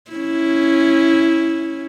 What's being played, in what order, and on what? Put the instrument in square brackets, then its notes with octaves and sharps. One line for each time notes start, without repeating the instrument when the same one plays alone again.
[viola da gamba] C#4 E4